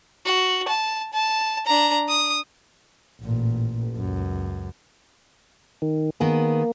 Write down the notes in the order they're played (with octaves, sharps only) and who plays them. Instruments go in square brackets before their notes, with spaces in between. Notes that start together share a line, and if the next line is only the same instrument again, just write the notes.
[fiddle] F#4
A5
A5
D4 A#5
D#6
[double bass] A1 A#2
C#2 F#2
[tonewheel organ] D#3
[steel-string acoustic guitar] D#3 B3 G#4 [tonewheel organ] A#3